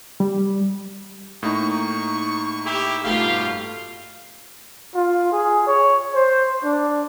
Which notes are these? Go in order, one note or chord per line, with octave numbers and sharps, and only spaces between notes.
G3
A2 A#3 D#4 C#6
E4 G4
G2 B2 A3 F4 G4 F5 C6
F4
G#4
C#5
C5
D4